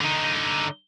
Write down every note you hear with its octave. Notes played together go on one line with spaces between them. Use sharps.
D3 D#4